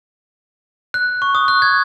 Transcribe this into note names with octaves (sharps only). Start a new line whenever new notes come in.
F#6
C#6
D#6
F#6
G#6